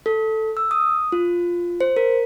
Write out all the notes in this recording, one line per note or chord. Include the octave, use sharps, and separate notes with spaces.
A4
E6
D#6
F4
C5
A#4